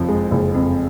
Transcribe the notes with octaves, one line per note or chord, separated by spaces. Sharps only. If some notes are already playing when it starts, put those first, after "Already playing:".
Already playing: F#1 F2 F3
G#3
F#1
F2